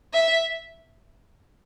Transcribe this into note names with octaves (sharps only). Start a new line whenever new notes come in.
E5